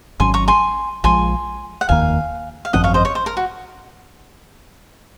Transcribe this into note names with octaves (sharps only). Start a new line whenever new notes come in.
G#1 G#2 F#3 C#4 G#5 C6
A#5 C#6
G#5 C6
A#1 G#2 F3 G#3 G#5 C6
F#5
F1 D#2 D#3 A#3 F5 G#5
F5
G#1 F#2 F3 C4 D#5 F#5
C#5 F5
C5 D#5
C#5
C5
A#4
F#4